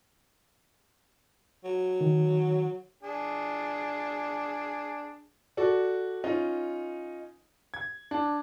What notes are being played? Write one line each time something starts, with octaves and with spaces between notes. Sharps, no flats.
F#3
D#3
D4 G#4
F#4 A4 D5
C#4 D#4 F4
G#6
D4